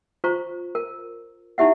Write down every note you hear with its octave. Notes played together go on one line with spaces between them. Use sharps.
F4 C5 A#5 C#6
A#4
D#4 E4 G4 E5 F#5